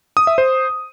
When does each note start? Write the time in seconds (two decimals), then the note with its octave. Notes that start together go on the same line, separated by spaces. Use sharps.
0.17 D#6
0.27 E5
0.38 C5